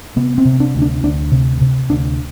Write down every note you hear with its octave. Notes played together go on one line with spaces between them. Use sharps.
C3 B3
C4
C3
D4
D2
D4
D2 D4
C3
C3
D2 D4